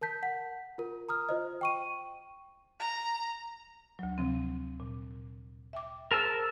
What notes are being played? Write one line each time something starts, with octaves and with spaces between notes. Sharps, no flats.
A#4 A5 G6 B6
F#5 B6
F4 A#4
A#5 D#6 F6
F4 C5 D#5
G5 C#6 D#7
A#5
D2 F#3
C3 F3 C4
A#2
E5 G5 D6
G#4 A#4 C5 A5 E6